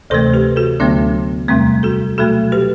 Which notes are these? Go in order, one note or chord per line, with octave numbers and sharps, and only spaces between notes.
D2 C3 E3 A3 A4 C5
G4 B4
F#4 A4
D2 D3 F#3 A3 B3 D4
E2 C3 G3 A3 C4
F#4 A4
B2 F#3 A3 F#4 A4
G4 B4